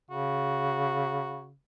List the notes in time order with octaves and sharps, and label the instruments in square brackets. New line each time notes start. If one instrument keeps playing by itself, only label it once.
[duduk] C#3 [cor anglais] F#4